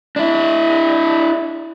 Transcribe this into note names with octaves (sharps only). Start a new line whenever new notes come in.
D4 E4